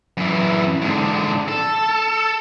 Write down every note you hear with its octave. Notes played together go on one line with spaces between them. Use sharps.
F#2 E3
G#2 D3
A4